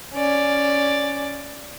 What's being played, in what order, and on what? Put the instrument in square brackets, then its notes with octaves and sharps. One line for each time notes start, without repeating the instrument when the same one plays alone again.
[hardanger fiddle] C#4 D5